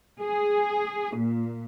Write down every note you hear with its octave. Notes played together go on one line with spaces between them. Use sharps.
G#4
A#2